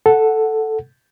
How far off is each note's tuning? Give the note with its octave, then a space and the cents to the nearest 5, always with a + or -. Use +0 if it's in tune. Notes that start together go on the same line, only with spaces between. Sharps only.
A4 +0 F#5 +0